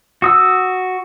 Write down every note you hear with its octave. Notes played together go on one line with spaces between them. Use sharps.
F#4 D#6 E6